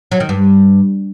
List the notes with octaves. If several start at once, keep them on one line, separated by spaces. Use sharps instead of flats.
F#3
D#3
G2